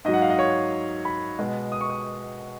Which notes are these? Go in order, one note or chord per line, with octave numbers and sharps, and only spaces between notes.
G#2 F#3 D#5
F#5
F5
D#5
C#5
B5
B2 G#3
D#6
C#6
D#6